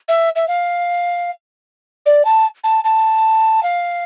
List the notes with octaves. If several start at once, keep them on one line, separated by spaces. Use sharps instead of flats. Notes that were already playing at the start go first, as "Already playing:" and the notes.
E5
E5
F5
D5
A5
A5
A5
F5